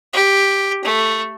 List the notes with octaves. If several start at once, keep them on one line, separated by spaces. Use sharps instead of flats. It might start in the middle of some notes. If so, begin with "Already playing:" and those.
G4
A3